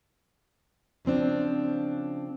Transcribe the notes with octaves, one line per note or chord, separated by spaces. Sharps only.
C#3 F3 C4 D4